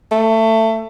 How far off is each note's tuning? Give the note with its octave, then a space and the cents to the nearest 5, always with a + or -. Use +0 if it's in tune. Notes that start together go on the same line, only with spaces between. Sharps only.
A3 +20